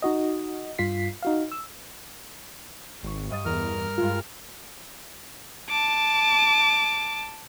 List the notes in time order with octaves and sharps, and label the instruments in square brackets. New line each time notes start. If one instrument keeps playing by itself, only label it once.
[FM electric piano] D#4 F#4 D#5
G2 F4 B6 C7
D#4 F#4 F5
E6
[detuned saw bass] G#1 [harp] C#6 C7
[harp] G2 D#5 A6
[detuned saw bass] E2 [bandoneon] A#4 F6
[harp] G2 G#3 [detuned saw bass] F4
[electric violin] A5 D6